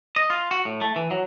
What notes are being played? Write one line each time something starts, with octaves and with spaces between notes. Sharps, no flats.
D#5
F4
F#4
A2
A3
E3
F#3